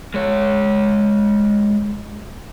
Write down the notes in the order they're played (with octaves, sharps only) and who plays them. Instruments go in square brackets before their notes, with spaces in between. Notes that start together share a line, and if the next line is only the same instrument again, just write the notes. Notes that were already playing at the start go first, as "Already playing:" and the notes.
[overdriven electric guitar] G#3 C#5